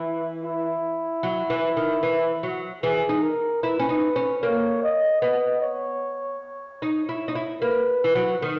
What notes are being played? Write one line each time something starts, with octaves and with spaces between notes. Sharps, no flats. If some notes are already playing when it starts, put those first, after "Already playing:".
Already playing: E3 E4
E4
F#3
E3
D#3
E3
F#3
E3 G#4
D#4
A#4
E4 B4
C#4
D#4
C#4
A#3 C#5
D#5
B3 D#5
C#5
D#4
E4
D#4
E4
A#3 B4
E3
F#3
D#3